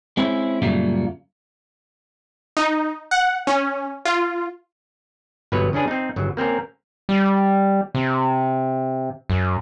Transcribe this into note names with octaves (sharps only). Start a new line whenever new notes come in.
G#3 C4 C#4 E4
F#2 A#2 C#3 G3 A3 A#3
D#4
F#5
C#4
F4
G1 B2 F#3 B3 B4 C#5
C#3 C#4 D4 G#4 B4
C4 D#4
G1 C#3 F#3
A#3 C4 C#4 A#4
G3
C3
F#2